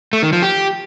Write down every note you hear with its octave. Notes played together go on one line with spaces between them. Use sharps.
A3
D#3
F3
G4